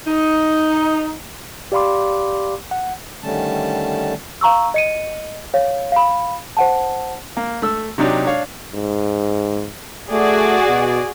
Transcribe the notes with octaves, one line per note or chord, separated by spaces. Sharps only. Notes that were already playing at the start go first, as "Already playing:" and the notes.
D#4
G4 D5 F5 B5 C6 D6
F#5
D3 D#3 G3 A3 C#4 A5
F5 A#5 C#6 E6
D#5 C#7 D#7
C#5 F5
F5 B5
C5 F#5 A5
A#3
A3 E6
C3 F#3 D4 D#4 G4
D4 C#5 F5
G#2
A3 F#4 G#4 D5
B2